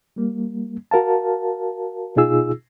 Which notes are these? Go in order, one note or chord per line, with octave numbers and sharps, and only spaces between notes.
G3 A#3
F#4 A#4 F5 A5
B2 D#4 F4 G#4 E6